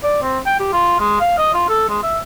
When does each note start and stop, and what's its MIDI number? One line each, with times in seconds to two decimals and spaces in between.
0.03 0.18 74
0.22 0.39 60
0.46 0.56 79
0.60 0.72 67
0.73 0.98 65
1.00 1.16 56
1.20 1.36 77
1.38 1.51 75
1.54 1.65 65
1.69 1.87 69
1.89 1.99 56
2.03 2.19 76